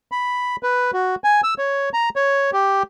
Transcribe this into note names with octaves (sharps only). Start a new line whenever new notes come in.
B5
B4
F#4
G#5
E6
C#5
A#5
C#5
G4